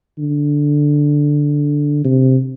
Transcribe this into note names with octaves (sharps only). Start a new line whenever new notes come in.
D3
C3